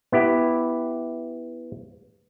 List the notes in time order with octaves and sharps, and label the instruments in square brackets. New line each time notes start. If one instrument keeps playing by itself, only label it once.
[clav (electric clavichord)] B3 E4 G4